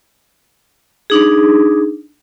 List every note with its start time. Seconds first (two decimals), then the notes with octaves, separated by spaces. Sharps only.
1.10 D4 D#4 G#4